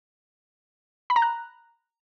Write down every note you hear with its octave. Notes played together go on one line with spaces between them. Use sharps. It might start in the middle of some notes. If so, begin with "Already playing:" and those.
B5
A#5
F#6